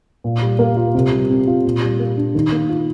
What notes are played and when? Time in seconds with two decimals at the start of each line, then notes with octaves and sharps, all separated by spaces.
0.24 A#2
0.42 G3
0.59 A#3
0.77 F4
0.95 C3
1.11 G3
1.30 C4
1.47 F4
1.65 A#2
1.82 G3
1.99 A#3
2.17 D4
2.35 D#3
2.52 A#3
2.69 F4